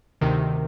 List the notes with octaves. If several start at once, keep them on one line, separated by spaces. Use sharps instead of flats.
D2 C3 D#3